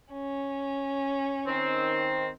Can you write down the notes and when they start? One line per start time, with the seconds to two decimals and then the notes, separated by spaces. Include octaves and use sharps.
0.13 C#4
1.46 D#3 C4